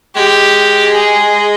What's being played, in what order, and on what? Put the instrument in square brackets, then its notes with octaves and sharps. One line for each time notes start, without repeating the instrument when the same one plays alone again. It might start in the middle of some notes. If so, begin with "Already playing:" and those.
[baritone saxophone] G#3 [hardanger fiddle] G4
[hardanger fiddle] G#4